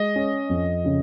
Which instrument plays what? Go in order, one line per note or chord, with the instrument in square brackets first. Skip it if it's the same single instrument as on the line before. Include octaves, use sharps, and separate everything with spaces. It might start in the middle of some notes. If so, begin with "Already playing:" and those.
Already playing: [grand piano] G#3 [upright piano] D#5
[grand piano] C#4
F2
C#3